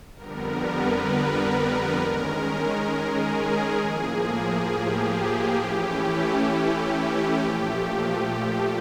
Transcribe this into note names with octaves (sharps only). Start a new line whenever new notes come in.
F2 D3 G3 B3 A#4
B4
A#4
D#3 G#3 C#4
G#4
A2 F3 A#3
G4
E3 A3 C#4 E4 G4
A#2 F3 A3